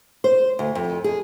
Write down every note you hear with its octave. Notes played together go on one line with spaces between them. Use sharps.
C5
D2
F2
G#4